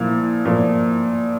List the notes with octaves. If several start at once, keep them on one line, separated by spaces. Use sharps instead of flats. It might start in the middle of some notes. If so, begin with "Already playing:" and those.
Already playing: A#2 F3 E4
A#2 F3